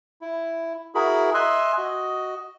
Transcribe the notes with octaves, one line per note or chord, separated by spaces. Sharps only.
E4
E4 F#4 G#4 A#4 B5
D#5 E5 G#5 C6 E6 F#6
F#4 D#5